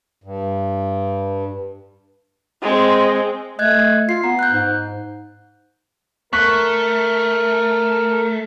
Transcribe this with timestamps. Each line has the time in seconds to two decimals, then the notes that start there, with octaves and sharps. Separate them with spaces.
0.24 G2
2.62 G#3 C4
3.59 A3 D#5 F#6 G#6
4.09 F4 C7
4.24 B3 A#5
4.39 F#6 G6
4.52 G#2
6.33 A3 A#4 C#6 F#6 B6